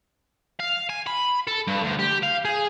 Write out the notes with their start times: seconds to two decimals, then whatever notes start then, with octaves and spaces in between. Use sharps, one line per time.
0.60 F5
0.90 G#5
1.07 B5
1.48 A4
1.68 G2
1.84 D2
2.00 G4
2.23 F5
2.45 G#4